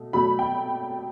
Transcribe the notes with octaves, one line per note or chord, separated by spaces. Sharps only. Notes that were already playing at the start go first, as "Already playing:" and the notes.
Already playing: B2 A3
B2 F#3 A3 B5
G5